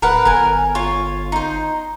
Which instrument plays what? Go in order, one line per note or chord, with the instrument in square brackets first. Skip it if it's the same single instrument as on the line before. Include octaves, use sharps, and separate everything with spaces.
[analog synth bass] D1 [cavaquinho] A#4 B4 F#5
[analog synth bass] G1 [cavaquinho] A#4 G#5
[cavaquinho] F4 C#5
D#4 C5